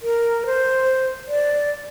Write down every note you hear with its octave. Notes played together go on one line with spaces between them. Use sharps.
A#4
C5
D5